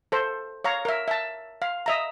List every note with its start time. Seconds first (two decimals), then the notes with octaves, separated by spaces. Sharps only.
0.12 A4 C5
0.64 C#5 F5 A#5
0.85 A#4 E5
1.08 E5 A5
1.62 F5
1.86 D#5 E5 A#5